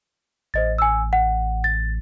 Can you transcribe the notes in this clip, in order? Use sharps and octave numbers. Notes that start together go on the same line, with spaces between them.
A1 C5 D#5 A6
G#5 E6
F#5
A6